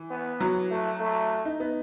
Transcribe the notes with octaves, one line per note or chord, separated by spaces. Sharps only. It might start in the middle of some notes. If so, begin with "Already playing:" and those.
Already playing: E3
B3
F#3
A3
A3
D#4
B3